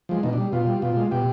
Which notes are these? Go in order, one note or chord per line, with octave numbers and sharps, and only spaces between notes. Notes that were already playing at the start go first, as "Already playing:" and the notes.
F3 G#3
B2 D#4
D4
G3
B2 F4
G3
B2 F4
G#3
B2 G4